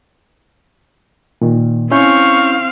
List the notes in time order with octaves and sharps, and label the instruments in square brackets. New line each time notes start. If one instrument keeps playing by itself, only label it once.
[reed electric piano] A#2 D#3
[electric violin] C4 F5 [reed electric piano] C#4 E4 G6 [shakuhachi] C#6